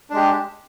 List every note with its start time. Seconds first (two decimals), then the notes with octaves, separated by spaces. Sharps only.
0.10 D4
0.13 G#3
0.16 G4